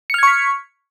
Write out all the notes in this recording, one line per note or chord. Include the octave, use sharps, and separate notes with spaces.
C#6 F6 G#6 B6 C#7